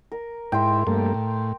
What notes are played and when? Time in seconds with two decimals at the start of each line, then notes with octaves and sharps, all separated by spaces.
0.12 A#4
0.52 G#2 E4 G5 C6
0.87 G2 A3 A#3
1.14 A2